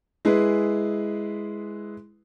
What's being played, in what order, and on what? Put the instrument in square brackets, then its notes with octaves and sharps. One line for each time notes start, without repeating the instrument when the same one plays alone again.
[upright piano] G#3 E4 G#4 B4